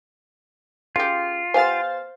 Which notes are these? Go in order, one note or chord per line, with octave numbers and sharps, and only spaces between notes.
C#3 F4 G4
B3 G4 C5 F5 G#5 A6